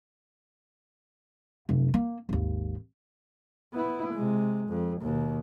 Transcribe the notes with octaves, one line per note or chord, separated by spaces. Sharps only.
F1 F#2
A#3
G#1 D#2
B3 E4
C3 G#3
F2
D#2 B2